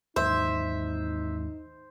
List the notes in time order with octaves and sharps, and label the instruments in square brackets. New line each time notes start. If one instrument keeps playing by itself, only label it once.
[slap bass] D#2 G#2 E3 [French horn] D#4 [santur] C5 [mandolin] E5